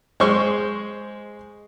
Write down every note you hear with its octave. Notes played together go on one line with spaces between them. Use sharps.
G#3 C5 C#6